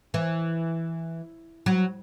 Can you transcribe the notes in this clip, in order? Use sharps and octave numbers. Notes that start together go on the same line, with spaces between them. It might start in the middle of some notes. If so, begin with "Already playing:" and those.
E3
F#3